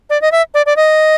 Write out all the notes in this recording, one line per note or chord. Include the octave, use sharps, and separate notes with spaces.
D5
D#5
E5
D5
D5
D#5